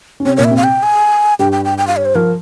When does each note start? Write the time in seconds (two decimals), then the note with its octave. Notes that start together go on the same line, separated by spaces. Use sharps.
0.20 C#4
0.25 C3 C4 C#5
0.37 A#2 A#3 C#5
0.44 E5
0.51 C3 C4
0.57 F5
0.64 G5
0.83 G#5
1.39 G2 G3 G5
1.52 G5
1.65 G5
1.78 G5
1.87 F5
1.97 C#5
2.05 C5
2.15 F3 A#4